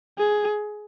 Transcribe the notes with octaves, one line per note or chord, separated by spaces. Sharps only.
G#4